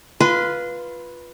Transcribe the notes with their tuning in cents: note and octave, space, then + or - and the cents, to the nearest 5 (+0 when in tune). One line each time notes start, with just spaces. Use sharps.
F4 +0 B4 -10 C6 -25